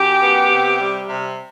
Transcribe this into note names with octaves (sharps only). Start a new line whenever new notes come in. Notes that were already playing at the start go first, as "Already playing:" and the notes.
Already playing: F#2 G4
B3
C3
G3
C3